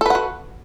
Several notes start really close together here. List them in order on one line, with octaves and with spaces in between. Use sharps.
A4 B4 F#5 F#4